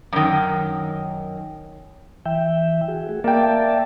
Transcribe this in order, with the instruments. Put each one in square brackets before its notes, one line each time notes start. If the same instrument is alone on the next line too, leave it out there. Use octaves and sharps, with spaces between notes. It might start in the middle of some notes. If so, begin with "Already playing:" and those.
[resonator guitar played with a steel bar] F#2 D#3
[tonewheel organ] E3 E5 G5
F#4 G#4
A3 F#4 G#4
[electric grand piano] A#3 G5 [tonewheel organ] D5 E5 A5